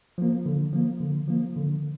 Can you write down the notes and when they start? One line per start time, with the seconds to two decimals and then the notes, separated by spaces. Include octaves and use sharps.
0.18 F3 A#3
0.46 D3
0.73 F3 A#3
1.00 D3
1.28 F3 A#3
1.56 D3